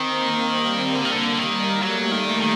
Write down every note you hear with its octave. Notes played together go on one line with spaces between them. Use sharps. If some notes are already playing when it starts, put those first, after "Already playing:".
Already playing: D#3 C4
A#3
G3
D3 A#3
D#3
D3
D#3 G3
F#3 A3
D#3
D#3